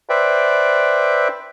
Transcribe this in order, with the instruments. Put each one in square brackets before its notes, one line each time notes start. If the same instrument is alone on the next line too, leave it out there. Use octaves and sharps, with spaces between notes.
[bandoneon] B4 C5 D5 E5 G5